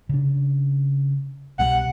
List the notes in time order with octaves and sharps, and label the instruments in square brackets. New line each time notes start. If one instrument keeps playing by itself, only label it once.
[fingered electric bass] C#3 D4
[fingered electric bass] C2 B2 G3 [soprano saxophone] F#5